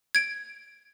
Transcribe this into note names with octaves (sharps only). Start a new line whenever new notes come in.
G#6 D7